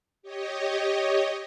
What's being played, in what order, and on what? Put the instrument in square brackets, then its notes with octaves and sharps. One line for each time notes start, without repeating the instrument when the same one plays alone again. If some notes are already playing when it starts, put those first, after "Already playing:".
[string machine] G4 C#5 D#5